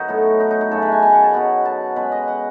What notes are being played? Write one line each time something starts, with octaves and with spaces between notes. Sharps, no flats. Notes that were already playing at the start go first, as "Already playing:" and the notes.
Already playing: F#2 D#4 F#4 B4 C#5
A2 F#3 B3
D#4
D#4
D#4
F#2 C#3 F#3 A3 A4
B4
G#5
G#5
F#5
A5
B2 F#3 B3
A5
B2 G#3 C#4 B4
D#5
F#5